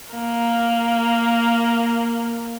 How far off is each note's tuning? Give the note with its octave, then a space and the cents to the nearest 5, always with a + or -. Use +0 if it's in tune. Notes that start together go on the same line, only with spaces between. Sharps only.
A#3 +0